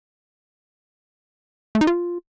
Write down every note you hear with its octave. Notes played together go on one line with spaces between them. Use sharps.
A3
D#4
F4